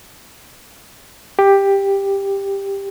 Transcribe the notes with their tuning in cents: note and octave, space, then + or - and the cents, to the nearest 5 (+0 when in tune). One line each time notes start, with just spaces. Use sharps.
G4 +10